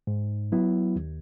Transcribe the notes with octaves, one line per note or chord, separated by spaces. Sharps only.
G#2
F#3 B3 E4
D#2